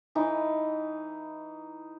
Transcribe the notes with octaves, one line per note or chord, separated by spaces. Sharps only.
E3 D#4